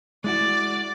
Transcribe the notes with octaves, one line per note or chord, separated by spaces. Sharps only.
G#3 E4 F#4 D5